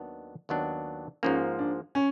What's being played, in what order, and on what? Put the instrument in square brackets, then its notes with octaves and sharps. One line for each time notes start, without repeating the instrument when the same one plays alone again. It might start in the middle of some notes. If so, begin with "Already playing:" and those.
Already playing: [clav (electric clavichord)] D#2 D#3 F#3 B3 D4
D#2 D#3 F#3 B3 D4
[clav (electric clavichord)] G#2 F3 A#3 [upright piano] C#4
[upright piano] D4
C#4